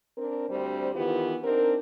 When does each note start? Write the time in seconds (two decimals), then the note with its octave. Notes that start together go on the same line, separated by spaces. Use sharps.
0.18 C4 D4 A#4
0.50 D2 D3 G3 C4 C5
0.95 D#3 E3 B3 F4 G4
1.44 C4 D4 D#4 A#4